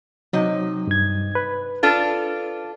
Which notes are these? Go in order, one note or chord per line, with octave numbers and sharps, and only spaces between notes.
C3 F#3 D#4
G2 G#6
B4
D4 F4 A4